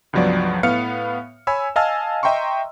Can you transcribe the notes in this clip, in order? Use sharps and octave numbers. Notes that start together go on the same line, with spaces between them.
C#2 G2 F3 F#3 B3 D5
A2 B3 F5 F6 C#7
C#5 G#5 B5 E6
D#5 F5 G#5 A5 E6 F6
D#5 E5 G5 A#5 C6 C#6